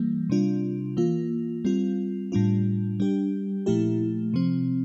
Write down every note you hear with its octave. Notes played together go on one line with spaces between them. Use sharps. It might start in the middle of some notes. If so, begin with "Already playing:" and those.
Already playing: E3 G3 A#3
C3 G3 D4 F4
E3 A#3 F4
G3 C4 F4
A2 G3 D4 F4
G3 D4 G4
A#2 F3 A3 E4 G4
C3 F3 C4